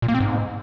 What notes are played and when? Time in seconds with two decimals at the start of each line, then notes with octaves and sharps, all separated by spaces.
0.02 A#2
0.08 A#3
0.14 C4
0.20 G#2